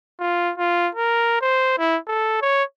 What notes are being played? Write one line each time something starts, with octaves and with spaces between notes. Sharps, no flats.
F4
F4
A#4
C5
E4
A4
C#5